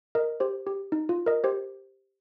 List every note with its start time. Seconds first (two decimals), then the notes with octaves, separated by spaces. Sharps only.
0.15 A#4 D#5
0.40 G4 C5
0.67 G4
0.92 D#4
1.09 F4
1.26 A#4 D#5
1.44 G4 C5